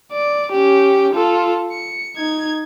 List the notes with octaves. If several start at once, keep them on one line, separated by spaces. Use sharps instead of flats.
D5
C#4 G4
F4 A4
C#7
D#4 G#6